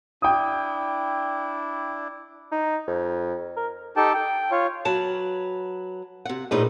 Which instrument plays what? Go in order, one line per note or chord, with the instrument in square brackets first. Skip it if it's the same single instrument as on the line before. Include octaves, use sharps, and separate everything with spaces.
[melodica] D4 E4 [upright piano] G5 D#6
[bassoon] D#4
F2
A#4
[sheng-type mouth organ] D#4 G4 A4 G5 A5
G5
F4 C#5
[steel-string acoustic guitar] F#3 B4 [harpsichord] A5
[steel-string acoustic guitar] C3 F#5
[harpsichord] A#1 [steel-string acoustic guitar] A2 D#4 B4